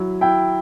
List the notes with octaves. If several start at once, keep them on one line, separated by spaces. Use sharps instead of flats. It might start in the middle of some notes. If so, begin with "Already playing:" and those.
Already playing: F#3 E4
E4 G5